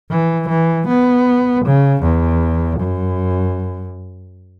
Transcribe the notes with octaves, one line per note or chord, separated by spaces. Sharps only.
E3
E3
B3
C#3
E2
F#2